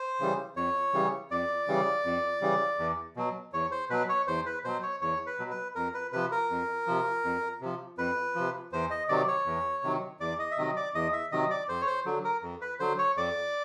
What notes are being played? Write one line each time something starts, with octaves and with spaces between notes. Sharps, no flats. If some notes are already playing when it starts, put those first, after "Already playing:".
Already playing: C5
C#3 E3 G3
F2 C#5
C#3 E3 G3
F2 D5
C#3 E3 G3
F2
C#3 E3 G3
E2
B2 F#3
E2 C#5
C5
B2 F#3 B4
C#5
E2 C5
B4
B2 F#3 C5
C#5
E2 C#5
B4
B2 F#3
B4
F2 A#4
B4
C3 F3 B4
A#4
F2
C3 F3
F2
C3 F3
F2 B4
C3 F3
E2 C5
D#5
C3 D#3 F#3 D5
C#5
E2
C3 D#3 F#3
E2 D5
D#5
E5
C3 D#3 F#3 D#5
D5
E2 D#5
E5
C3 D#3 F#3 D#5
D5
F2 C5
C#5
C5
D3 F#3
A#4
F2
B4
D3 F#3 C5
C#5
F2 D5